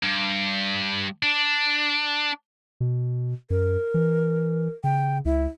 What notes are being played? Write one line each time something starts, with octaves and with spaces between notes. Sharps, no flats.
G2
D4
B2
F#2 A#4
E3
C#3 G5
C#2 E4